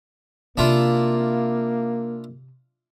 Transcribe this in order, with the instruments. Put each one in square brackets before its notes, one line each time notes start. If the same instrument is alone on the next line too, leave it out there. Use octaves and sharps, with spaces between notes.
[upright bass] C3 C4 [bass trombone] A#3 [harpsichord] D4 E4 F4